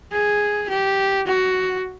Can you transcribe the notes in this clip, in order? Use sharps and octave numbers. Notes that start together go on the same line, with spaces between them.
G#4
G4
F#4